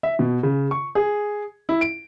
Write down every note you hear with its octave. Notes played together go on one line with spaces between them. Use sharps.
E5
B2
C#3
C#6
G#4
E4
D7